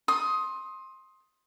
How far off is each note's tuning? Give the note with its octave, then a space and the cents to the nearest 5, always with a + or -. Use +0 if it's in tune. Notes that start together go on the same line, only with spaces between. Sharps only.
C6 +20 D#6 +15